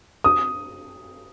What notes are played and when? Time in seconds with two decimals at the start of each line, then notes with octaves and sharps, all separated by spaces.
0.24 D#6